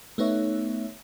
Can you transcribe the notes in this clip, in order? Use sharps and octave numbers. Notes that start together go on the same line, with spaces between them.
A3 B3 D#4 C#5 E5